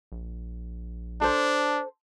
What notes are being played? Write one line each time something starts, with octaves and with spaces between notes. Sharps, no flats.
A#1
D4 A4 C5